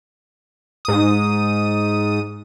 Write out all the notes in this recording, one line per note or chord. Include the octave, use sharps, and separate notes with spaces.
G#2 D#6